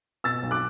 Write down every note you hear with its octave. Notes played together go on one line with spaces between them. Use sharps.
B2 E6 A6
B1
D6 F#6